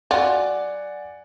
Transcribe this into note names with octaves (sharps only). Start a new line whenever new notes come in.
F#3 F4 D5 F#5 G#5